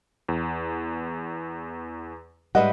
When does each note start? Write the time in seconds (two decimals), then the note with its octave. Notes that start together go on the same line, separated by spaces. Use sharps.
0.29 E2
2.55 G#2 C#3 G3 B4 D#5 E5 F#5